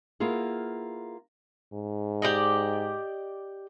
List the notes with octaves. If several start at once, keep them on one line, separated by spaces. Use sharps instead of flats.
A#3 B3 E4 F4 G#4
G#2
G4 D5 D#5